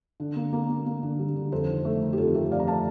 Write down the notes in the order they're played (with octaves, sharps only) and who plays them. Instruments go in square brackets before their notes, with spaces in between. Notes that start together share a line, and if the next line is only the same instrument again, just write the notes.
[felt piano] D3
A#3
A#3
A#3
A#3
D3
G3
D3
F2 A4 C5
D#3
A3
D#3
G4
F2 F4 A4
A3 G4 A#4
F2 D5 F5
A#5
A3 F5 A5